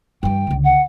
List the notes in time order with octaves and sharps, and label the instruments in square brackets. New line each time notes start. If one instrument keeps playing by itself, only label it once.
[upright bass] G2 E3 [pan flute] G5
[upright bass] C#2 D3
[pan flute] F#5